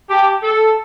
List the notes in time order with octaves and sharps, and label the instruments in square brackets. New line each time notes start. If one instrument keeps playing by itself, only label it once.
[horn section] G4 [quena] A5
[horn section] A4
[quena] A5